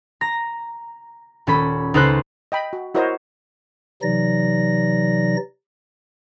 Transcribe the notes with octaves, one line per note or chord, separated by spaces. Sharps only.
A#5 A#6
D#1 C#4 A4 B5
C#2 D#4 A4 B4 C5 F#6
D#5 G5 B5
F#4
E4 F#4 A#4 C5 C#5 D#5
C3 E3 F#3 D#4 D5 A#6